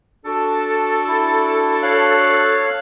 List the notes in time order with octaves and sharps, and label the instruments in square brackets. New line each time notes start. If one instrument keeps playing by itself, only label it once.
[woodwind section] D4 F#4 A4
[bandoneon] E4
C#5 F5 F#6